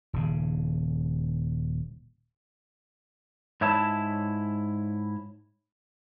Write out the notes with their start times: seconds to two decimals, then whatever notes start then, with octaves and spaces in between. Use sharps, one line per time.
0.13 D#1 C#3
3.61 G#2 E4 C#5 E5 A5